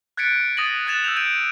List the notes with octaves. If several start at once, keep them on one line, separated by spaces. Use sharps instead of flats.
F#6 G#6 A6 B6 C#7 D7
D#6 A6 A#6 D#7 F#7
F#6 G#6 A6 E7 F7
E6 G6 F7
G6 G#6 D7 D#7